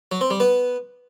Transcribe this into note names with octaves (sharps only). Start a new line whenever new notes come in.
F#3
C4
G3
B3